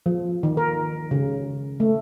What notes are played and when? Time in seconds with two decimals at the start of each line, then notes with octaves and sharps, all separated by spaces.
0.06 F3
0.43 D#3
0.57 A#4
1.11 C#3
1.80 A3